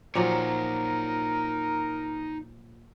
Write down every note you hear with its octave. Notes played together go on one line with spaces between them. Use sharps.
A#2 F3 F#3 D#4 A#4 C#5